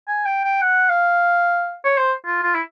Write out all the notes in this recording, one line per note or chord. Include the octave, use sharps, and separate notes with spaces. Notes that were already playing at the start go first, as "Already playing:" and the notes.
G#5
G5
G5
F#5
F5
C#5
C5
F4
F4
E4